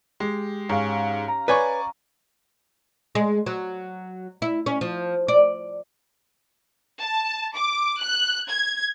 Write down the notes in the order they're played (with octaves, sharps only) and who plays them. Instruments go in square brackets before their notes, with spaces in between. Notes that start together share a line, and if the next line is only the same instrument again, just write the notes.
[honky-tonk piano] G#3 [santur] G4
[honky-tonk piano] G#2 [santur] C#4 F5
[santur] A#5
[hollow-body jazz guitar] B4 C#5 [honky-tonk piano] D5 G#5 C#6
[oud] G#3
F#3
E4
C#4
F3
D5
[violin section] A5
D6
F#6
G#6